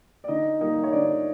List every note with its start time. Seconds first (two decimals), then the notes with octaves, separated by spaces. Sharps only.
0.24 D5
0.28 D3 D#4 D#5
0.60 G3 A#3 D#4 D#5
0.84 C#5
0.92 D3 D4 D5